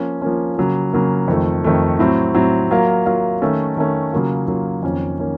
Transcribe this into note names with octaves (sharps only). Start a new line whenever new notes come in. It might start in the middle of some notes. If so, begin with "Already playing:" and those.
Already playing: F3 A#3 C#4
F3 A#3 C#4
C#3 F#3 A#3
C#3 F#3 A#3
F2 D#3 A3
F2 D#3 A3
A2 F#3 C4
A2 F#3 C4
F#3 A#3 F4 A#4 F5
F#3 A#3 F4 A#4 F5
D#3 A3 C#4 A4
D#3 A3 C#4 A4
C#3 F#3 A#3 F4
C#3 F#3 A#3 F4
F2 D#3 A#3 C#4
D#3 A#3 C#4